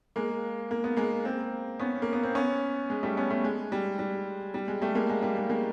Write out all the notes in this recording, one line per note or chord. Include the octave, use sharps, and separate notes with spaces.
G#3 A#3
A#3
B3
G#3 A#3
A#3 C4
B3 C#4
A#3
B3
C4
B3 C#4
G#3
G3 A3
B3 C#4
A3 B3
G#3
G3
G3
G3
G#3
G3 A3
G#3 A#3
G#3
G3
G#3
G#3 A#3